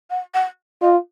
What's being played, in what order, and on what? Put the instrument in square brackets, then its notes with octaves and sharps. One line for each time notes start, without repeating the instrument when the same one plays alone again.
[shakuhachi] F#5
F#5
[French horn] F4 [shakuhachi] D#5